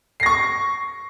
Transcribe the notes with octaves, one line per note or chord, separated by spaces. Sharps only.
C#6 A#6 C7